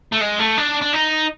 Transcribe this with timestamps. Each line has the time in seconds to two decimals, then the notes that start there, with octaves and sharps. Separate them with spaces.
0.12 A3
0.21 G#3
0.39 A3
0.58 D4
0.82 D4
0.93 D#4